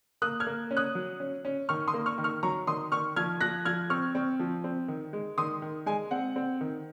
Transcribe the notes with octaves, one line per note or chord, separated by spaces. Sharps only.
A#3 D#6 F#6
F6 G#6
A#3
C#4
D#6 F#6
F#3
C#4
C#4
D#3 C#6 F6
C6 D#6
A#3
C#6 F6
D#3
C#6 F6
F#3 A#5 C#6
D#3 C6 D#6
D#3 C#6 F6
F3 F6 G#6
F3 F#6 A#6
F3 F6 G#6
C4 C#6 F6
C4
F3
C4
D#3
G#3
D#3 C6 D#6
D#3
G#3 G#5
C4 F#5
C4
D#3